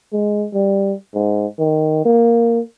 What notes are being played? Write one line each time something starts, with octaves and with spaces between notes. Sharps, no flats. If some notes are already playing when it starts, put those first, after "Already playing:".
G#3
G3
G#2
D#3
A#3